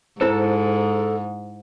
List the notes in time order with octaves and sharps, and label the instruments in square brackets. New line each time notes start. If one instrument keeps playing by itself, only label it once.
[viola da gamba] G#2 [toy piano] E4 C5 [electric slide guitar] A4 A5